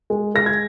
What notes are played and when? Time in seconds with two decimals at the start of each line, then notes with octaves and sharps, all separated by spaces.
0.10 G#3
0.35 G#3 A#6
0.46 G#6